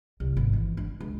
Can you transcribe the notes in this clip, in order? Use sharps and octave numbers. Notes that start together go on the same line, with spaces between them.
C2
G#1
E3
D4
C#2